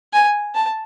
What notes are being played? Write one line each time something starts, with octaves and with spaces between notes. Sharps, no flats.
G#5
A5